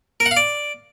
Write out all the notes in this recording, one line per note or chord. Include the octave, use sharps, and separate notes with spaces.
A#4
F#5
F5
D5